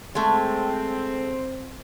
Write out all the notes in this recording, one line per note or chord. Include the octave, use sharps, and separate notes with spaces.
G#3 A3 C4